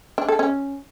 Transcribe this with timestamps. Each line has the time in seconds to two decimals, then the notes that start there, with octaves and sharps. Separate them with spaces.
0.18 D4
0.29 A4
0.39 C#4